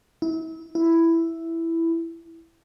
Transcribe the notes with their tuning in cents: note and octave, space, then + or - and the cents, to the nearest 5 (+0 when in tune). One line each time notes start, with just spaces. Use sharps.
E4 -35
E4 +5